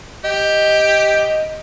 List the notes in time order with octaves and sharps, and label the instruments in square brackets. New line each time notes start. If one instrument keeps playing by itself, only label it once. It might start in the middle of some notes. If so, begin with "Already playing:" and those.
[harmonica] G4 [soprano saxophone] D#5